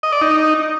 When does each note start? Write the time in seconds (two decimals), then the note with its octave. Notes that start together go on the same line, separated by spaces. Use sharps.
0.03 D#5
0.12 D5
0.22 D#4